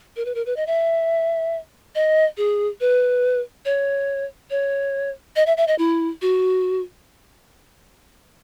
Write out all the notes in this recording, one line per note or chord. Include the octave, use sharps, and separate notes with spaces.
A#4
B4
A#4
B4
D#5
E5
D#5
G#4
B4
C#5
C#5
D#5
E5
E5
D#5
E4
F#4